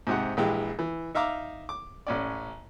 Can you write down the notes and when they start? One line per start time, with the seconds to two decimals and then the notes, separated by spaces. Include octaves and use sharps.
0.07 G#2 C3 F#5
0.37 A#1 E3 G#3 G4
0.79 E3
1.15 D#4 E5 F5 A#5 D6
1.69 D6
2.07 A1 C#4 D5